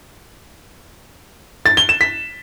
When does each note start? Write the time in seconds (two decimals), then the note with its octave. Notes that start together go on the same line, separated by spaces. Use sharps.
1.66 A6
1.77 G7
1.89 E7
2.01 B6